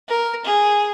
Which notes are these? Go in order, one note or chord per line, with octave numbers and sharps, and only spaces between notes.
A#4
G#4